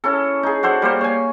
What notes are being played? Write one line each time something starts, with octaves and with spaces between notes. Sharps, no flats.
C#4 E4 A4
D#4 G#4
F#4 A4 C5 D5
G3 A#3 C5
C#5 G#5